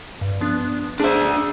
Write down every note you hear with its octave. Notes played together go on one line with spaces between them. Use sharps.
G2
F3 B3 D4
D4 G#4 C5 E5